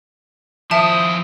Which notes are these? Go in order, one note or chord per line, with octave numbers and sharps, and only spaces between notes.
F3 E4 E5 A5 D#6